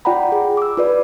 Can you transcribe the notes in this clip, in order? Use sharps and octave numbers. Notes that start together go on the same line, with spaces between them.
F4 D5 F#5 G5 A#5 B5
G#4
D6 E6
F4 B4 D5